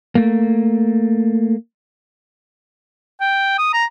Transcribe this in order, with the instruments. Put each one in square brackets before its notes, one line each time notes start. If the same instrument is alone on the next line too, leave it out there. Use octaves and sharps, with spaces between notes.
[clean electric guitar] A3 A#3
[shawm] G5
D#6
A#5